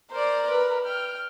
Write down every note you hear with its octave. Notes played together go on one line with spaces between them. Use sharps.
A#4 C5 D5
B4
G5 F6